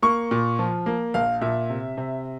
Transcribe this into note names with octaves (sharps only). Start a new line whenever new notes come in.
A#3 C#6
A#2
F3
A#3
A#1 F5
A#2 E5
C3
C3